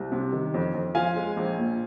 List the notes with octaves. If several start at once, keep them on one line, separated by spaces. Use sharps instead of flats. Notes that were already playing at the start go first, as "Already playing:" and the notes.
Already playing: C2
C3
D#3
F2
F2
F3 F5 G#5
G#3
A#1
A#2